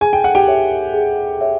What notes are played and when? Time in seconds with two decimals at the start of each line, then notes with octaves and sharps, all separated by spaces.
0.01 G#4 G#5
0.13 G5
0.24 F#5
0.35 G4 G5
0.48 C#5 E5
0.94 G#4
1.41 C#5 E5